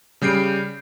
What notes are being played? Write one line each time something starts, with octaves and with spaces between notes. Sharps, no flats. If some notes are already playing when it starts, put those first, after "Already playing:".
C#3 G3 G6 C7 D7